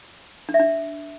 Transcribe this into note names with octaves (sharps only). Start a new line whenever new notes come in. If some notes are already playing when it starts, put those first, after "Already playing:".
D4
E5
D4